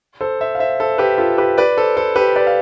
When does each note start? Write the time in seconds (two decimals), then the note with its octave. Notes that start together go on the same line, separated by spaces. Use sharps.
0.21 A4 C5
0.41 C5 E5
0.55 F5
0.59 C5 E5
0.80 A4 C5
0.98 G4 B4
1.18 F4 A4
1.38 G4 B4
1.58 B4 D5
1.77 A4 C5
1.96 A4 C5
2.16 G4 B4
2.36 B4 D5
2.47 F5